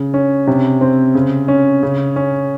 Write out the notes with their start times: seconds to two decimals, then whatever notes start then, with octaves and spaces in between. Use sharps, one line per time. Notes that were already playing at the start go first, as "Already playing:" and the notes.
Already playing: C#3
0.14 C#4
0.47 C3
0.81 C4
1.15 C#3
1.48 C#4
1.83 C#3
2.16 C#4